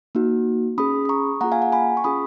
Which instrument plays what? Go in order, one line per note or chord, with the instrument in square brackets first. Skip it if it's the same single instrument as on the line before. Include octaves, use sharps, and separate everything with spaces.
[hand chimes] A#3 D#4 F#4
C#4 G#4 B5 D#6
D#6
A#5 C#6
A#3 F4 G#4 F#5 A#5
F5 G#5
F#5 A#5
G#5 B5
C#6
C#4 F4 G#4 B5 D#6